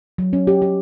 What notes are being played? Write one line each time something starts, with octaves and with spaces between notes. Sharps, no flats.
F#3
C#4
G4
G4